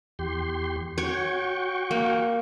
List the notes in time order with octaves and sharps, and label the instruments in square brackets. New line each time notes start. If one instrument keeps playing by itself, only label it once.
[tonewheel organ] E2 G4 C6
[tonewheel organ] F#4 G5 C#6 [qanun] C#5
[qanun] A#3